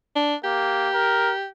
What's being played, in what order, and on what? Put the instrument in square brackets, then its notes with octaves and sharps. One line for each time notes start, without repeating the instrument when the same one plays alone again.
[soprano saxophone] D4
[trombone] A#3 [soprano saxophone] G4
[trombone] A#4